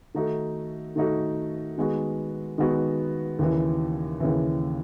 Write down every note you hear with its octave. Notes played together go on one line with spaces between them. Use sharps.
D#3 A3 D#4 F#4
D#3 A3 D#4 F#4
D#3 G#3 B3 F#4
D#3 G#3 B3 F#4
D#2 C#3 E3
D#2 C#3 E3